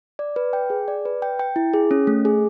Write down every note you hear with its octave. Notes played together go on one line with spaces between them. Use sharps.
D5
B4
G5
G#4
D5
B4
G5
G5
E4
G#4
C#4
A3
G#4